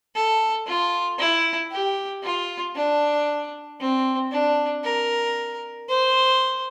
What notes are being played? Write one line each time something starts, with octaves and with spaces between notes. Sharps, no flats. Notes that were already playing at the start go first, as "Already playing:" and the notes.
A4
F4
E4
G4
F4
D4
C4
D4
A#4
C5